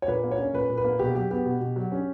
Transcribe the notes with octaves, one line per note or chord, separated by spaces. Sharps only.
C#5
A#2 B4
A#3
C#5
C#4
A#2 B4
A#2
B4
A#3
B2 G4
F#3 G4
B3 G4
B2
B2
F#3
C#4